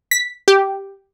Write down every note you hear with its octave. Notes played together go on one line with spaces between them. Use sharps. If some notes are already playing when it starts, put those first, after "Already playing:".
B6
G4